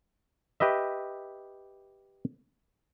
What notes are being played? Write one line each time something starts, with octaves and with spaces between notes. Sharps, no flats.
G4 B4 D#5 E5